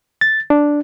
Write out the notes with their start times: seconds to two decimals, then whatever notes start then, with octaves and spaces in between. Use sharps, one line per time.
0.21 A6
0.50 D4